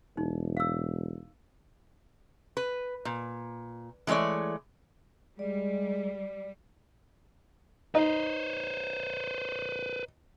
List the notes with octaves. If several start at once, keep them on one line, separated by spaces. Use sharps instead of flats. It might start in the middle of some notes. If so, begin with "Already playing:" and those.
E1 D#4
F5 E6
B4
A#2
E3 G#3 A3 C#5 D5
G3 G#3 D5
D#4 B4 C5